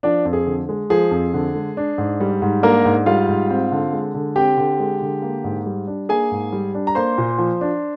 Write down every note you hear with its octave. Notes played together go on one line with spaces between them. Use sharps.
F3 D4 D5
F2
G#4
D3
G#3
F3 G#4
F2
D3
G#3
D4
G#2
G3
G#2
A#3 D4 A#4
G#2
G3 F4 F5
G#2
C4
D3
G#3
D3
C4 G4 G5
D3
G#3
D3
A#3
G#2
G3
D4
A#3 G#4 G#5
G#2
G3
D4
A#5
A#3 C5 C6
A#2
F3
D4